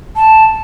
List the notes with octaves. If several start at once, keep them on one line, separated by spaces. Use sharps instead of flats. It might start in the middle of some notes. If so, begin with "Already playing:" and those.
A5